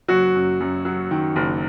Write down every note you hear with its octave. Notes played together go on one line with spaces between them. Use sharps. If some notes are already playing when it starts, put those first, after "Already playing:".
F#1 F#3 F#4
F#2
F#2
F#3
D#3
F#1